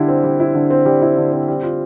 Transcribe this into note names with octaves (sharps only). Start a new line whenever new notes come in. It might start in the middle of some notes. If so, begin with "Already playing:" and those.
Already playing: D3 G3 E4
C4
G3
E4
D3
C4
G3
E4
D3
C4
G3
F4